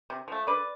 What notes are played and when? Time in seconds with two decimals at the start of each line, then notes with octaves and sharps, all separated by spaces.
0.10 C3
0.28 F3 A3
0.47 D3 B4 D5